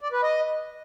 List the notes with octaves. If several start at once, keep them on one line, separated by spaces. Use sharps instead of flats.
D5
B4
D#5